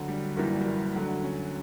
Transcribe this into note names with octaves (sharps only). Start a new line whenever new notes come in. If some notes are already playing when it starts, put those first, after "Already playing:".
Already playing: D2 D3 F#3
G3
G1 F#2 E3 G3 A#3
G3
A#3
D2 D3 F#3
C#4